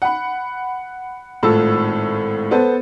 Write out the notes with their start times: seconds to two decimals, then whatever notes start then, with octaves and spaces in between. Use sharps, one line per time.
0.02 F#5 B5
1.43 G#1 A2 F4 A4 E6
2.51 B3 A4 C5